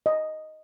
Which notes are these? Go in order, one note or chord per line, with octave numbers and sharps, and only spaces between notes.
D#5